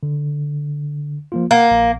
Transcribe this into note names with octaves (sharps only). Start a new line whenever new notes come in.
D3
F3 A#3 F4
A#3 A#4 F#5
A#1